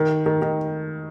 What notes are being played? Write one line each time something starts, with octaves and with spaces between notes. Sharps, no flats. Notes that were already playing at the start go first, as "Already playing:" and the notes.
Already playing: D#3
D#3
D#3